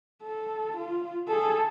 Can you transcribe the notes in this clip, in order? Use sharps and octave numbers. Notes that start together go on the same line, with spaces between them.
A4
F4
G#4 A4